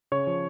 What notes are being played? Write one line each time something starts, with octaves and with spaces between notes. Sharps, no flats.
C#3 C#5 C#6
F3